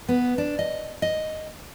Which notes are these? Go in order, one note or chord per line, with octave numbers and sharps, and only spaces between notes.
B3
D4
D#5
D#5